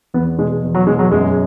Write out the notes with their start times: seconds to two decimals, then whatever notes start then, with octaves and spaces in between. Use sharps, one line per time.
0.14 E2 B3
0.38 B2 G#3
0.63 E2
0.75 F#3
0.87 B2 G#3
0.99 F#3
1.11 F#2 G#3